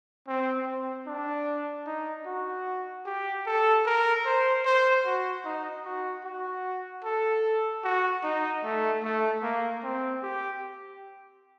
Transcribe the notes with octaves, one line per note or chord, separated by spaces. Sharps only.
C4
C4
D4
D#4
F#4
G4
A4
A#4
C5
C5
F#4
D#4
F#4
F#4
A4
F#4
D#4
A3
A3
A#3
C4
G4